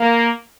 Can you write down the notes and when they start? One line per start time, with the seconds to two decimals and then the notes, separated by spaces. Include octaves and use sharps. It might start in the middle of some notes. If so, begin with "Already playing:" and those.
Already playing: A#3